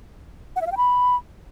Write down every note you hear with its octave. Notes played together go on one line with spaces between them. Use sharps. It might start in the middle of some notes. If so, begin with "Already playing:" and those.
F#5
E5
F5
G5
B5